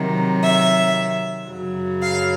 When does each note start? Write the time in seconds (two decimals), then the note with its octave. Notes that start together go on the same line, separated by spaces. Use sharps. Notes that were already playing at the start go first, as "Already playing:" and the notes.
Already playing: C3 D#3 F#3
0.44 E5
1.49 F#2 C#3 F#3
2.02 F5